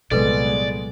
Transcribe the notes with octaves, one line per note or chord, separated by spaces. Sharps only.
C2 A#2 F#3 G#3 B3 A4 B4 D5